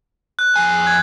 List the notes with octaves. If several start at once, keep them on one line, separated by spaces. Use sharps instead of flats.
F#6
F2 G#4 G#5
G#6